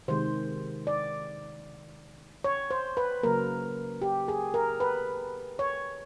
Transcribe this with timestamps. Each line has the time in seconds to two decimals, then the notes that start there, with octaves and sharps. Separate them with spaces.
0.08 C3 D#3 G#3 C5
0.87 D5
2.44 C#5
2.71 C5
2.97 B4
3.23 C#3 F#3 A#3 A#4
4.02 G4
4.28 G#4
4.54 A#4
4.80 B4
5.59 C#5